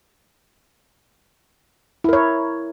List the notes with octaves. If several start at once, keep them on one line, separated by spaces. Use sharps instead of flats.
E4 A#4 C#5